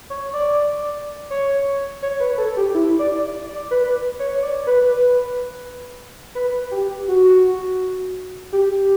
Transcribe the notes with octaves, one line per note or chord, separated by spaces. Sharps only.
C#5
D5
C#5
C#5
B4
A4
G4
E4
D5
D5
B4
C#5
D5
B4
B4
G4
F#4
G4